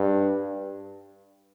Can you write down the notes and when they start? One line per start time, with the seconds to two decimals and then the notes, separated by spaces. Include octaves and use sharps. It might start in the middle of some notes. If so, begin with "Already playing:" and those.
Already playing: G2